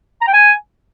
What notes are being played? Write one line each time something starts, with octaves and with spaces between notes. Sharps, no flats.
A#5
G5
G#5